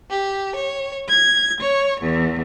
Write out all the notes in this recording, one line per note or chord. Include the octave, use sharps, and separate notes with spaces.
G4
C#5
G#6
C#5
E2